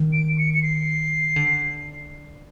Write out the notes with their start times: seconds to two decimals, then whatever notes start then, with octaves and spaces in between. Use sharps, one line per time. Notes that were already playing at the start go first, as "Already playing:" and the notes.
Already playing: D#3
0.13 D7
0.38 C#7
0.54 C#7
0.63 C7
1.36 D3